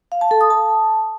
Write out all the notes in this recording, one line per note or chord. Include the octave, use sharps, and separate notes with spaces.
F5
A5
A4
D#6
A5